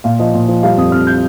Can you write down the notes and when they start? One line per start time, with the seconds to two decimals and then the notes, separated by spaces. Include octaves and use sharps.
0.04 A#2 F5
0.19 F3 D#5
0.34 A#2
0.48 F3
0.63 G3 F5
0.77 F2 D#6
0.92 F2 F6
1.07 G6